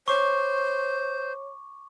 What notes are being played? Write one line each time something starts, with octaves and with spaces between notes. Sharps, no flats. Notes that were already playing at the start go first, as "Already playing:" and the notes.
C5 C#5 C#6 D6